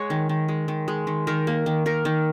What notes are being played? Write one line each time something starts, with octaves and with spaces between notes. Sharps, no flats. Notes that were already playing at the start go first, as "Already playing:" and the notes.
Already playing: G#3 C#5 F#5
D#3
D#3
G#3
D#3
G#3
D#3
D#3 A#4
A#3
D#3
D#3 A#4
D#3